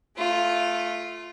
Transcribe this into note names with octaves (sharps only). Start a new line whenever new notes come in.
A3 F4